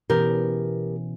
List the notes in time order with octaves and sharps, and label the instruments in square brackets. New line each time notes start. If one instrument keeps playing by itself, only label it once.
[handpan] B2 E3 C#4 [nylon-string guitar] B3 G4 A#4